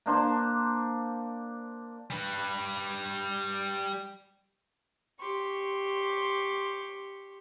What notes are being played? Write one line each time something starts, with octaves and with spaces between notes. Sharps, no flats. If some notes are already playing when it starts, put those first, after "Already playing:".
A#3 D4 C5
G3 B4
G4 C6 C#6